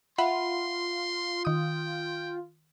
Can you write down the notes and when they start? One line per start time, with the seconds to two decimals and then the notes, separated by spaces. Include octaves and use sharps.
0.18 F4 E5 F#5 B5 C6
1.45 D#3 G5 D#6